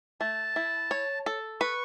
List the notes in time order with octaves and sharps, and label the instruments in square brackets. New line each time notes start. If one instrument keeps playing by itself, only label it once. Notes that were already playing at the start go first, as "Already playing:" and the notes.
[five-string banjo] A3 [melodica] A5
[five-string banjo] E4
C#5
A4
[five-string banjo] B4 [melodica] C#6